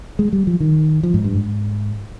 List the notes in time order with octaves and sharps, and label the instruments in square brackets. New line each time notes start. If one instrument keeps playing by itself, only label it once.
[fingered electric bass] G#3
G3
F3
D#3
F3
G#2
G2
G#2